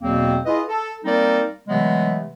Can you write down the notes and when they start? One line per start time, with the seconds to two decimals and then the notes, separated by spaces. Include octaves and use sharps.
0.01 E2 B2 F#3 A#3 C4
0.46 E4 F4 G#4 B4 D#5
0.68 A4
1.05 G3 A#3 C4 D#4 A#4 D5
1.68 C3 E3 F#3 G#3 A3 B3